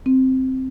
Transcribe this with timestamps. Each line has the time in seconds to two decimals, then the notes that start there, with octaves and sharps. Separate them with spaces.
0.06 C4